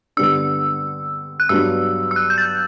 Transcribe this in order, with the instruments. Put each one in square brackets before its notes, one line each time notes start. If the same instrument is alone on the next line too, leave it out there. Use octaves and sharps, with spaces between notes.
[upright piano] G2 D3 G3 B3 D4 [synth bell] E6
[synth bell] F#6
[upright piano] G2 F#3 B3 D4 [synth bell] E6
[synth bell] E6
F#6
G6
A6